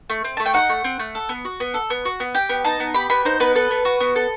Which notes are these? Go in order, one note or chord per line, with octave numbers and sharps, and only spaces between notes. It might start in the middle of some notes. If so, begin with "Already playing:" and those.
A3
C4
A3 A5
G5
D#4 F#5
A3
C4
A3
A4
B3
F#4
B3
A4
B3
F#4
B3
G4 G5
B3
D#4 A5
B3
G4 B5
B3 B5
D#4 C5
B3 B4
A4 B4
B3
F#4
B3
A4